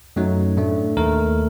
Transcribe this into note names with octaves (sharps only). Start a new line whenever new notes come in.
F#2 F#3 A3 D#4
A2 A3 D4
D#2 D#3 A3 A#4